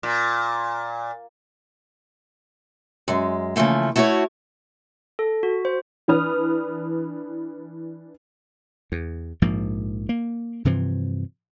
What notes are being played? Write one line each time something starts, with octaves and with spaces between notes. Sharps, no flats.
A#2
F#2 G#3
C#3 E3 F3 A3 A#3
A3 E4 F#4 C5 C#5
A4
F#4
C5
E3 D4 B4 D#6 F6
E2
A#1 G#2 F3 A#3
A#3
G2 C3 E3 F3